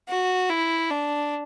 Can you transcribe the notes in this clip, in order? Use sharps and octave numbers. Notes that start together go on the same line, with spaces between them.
F#4
E4
D4